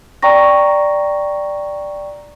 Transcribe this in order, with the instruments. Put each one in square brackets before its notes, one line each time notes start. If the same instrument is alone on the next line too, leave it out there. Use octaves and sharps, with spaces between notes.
[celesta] D5 G5 A#5 C#6 A#6